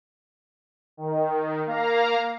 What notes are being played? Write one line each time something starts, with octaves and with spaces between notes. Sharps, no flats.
D#3
A#3 F5 A#5